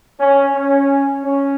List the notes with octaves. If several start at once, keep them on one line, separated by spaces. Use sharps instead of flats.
C#4
C#4
C#4